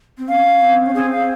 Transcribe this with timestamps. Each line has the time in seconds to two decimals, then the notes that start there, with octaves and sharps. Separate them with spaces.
0.18 C4
0.28 C#4 F5
0.62 C4
0.86 C#4
0.95 C4 G#4
1.11 F5